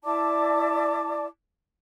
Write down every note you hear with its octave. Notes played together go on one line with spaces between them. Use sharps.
E4 D5 A5 D6